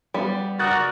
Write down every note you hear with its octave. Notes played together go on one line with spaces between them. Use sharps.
G3 B3
F#4 A#4 D5 D#6 F#6 A6